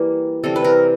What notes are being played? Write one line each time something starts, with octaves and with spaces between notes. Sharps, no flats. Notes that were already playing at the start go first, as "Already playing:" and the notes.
Already playing: E3 G3 A#3
C3 E3 G3 A4
B4
A#4